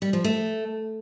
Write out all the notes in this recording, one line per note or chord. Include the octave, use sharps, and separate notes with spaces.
G3
F3
A3